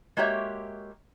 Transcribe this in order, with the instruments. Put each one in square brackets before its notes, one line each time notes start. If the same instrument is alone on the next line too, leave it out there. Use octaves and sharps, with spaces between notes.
[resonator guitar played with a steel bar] G#3 A#3 F#4 G4 C#5 E5